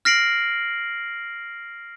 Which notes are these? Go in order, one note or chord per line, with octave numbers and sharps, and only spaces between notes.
F6 A#6 C7 D7 F#7